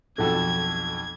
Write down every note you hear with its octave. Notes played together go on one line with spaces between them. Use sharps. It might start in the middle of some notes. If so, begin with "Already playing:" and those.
B1 F2 F#4 A4 G#6